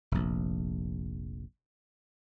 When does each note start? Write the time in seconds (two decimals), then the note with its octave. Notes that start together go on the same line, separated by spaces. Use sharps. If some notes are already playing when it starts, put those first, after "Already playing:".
0.12 F1 A#1